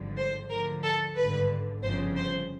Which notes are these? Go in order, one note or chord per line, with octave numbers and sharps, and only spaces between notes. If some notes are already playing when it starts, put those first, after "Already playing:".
Already playing: G#1 G2 D3 F3
C5
D2 D3 F3 A#4
A4
G#1 G2 D3 B4
G1 F2 C#3 F3 C5
C5